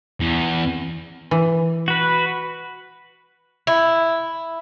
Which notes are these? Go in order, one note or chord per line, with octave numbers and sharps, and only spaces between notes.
E2
E3
F#4 B4
E4